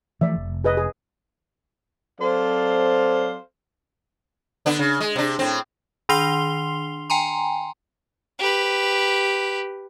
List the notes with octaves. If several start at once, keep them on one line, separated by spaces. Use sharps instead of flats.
E3 F3 A3 D5 E5
F1
G#4 B4 D#5
G#4
F#3 C4 A4 C5 D5 F5
D3 B3 D4
C#3
G#3
C3 D4
A2 C4
D#3 D4 C6 C7 F7 G7
G5 G#5 A#5 C6
G4 B4